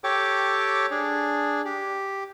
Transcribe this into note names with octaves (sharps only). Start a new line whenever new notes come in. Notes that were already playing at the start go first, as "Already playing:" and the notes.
G4 A4 C#5 G5 D6
D4 G#4
G4